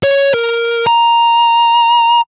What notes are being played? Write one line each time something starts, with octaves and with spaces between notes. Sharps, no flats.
C#5
A#4
A#5